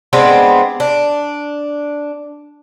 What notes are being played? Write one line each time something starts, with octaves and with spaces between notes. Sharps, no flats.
G#3 B3 C4 D4
D4